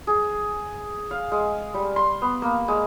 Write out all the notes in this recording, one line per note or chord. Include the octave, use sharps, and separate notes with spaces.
G#4
F5
G#3
G3
C6
B3
A#3
G#3